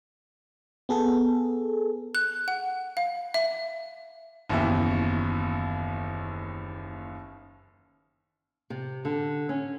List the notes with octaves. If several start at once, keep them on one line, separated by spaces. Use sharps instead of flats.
B3 G#4 A4
F#6
F#5
F5
E5
F#1 D#2 B2 E3 E5 G5
C3
D3
C#4